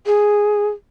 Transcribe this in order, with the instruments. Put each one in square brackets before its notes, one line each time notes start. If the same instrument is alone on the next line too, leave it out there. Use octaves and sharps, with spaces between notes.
[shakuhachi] G#4